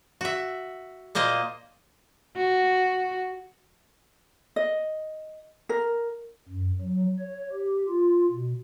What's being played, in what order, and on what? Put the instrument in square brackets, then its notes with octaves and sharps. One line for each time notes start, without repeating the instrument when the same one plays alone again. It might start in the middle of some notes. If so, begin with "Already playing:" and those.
[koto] F#4 E5
A#2 A#3 C5 D#5
[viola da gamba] F#4
[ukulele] D#5
A#4
[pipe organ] F#2
F#3
C#5
G4
F4
B2